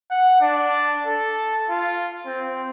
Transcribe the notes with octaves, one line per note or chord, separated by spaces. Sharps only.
F#5
D4
A4
F4
C4